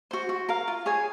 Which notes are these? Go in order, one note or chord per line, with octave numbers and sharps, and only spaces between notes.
F#4 C5
F#4
A#4 F5 A#5
F4
G#4 C#5 G#5